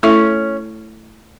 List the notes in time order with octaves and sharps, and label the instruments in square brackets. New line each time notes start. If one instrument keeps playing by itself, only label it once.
[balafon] A3 E4 A4 E5 [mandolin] C#4